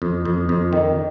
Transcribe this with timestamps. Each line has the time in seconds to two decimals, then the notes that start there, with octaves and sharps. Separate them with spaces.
0.02 F2
0.25 F2
0.49 F2
0.73 D#3